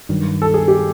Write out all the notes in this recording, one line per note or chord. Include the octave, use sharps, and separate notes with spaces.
G2 D#3 F#3
A4
G#4
G4